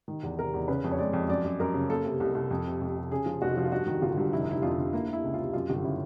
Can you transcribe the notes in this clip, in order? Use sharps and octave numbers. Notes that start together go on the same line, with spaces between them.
D#3
E2
C3 A#4
E2
C#3 B4
F2
C#5
G#3 D5
F2
F#2 D5
F#2
F#2 A#4
C#3
A#3 A4
C3
C2
C2
F2
C3
F2
C3
C#3 G#4
F3
F1 F#4
F3
F4
G2 F#4
D#3
G1 F4
G2
F1 E4
D#4
D3 E4
F2 F4
D3
A#3 E4
A#3
E4
C#2
F4
C3
F#2 F4
G1
C#3 E4